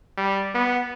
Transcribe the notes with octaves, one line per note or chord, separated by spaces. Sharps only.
G3
B3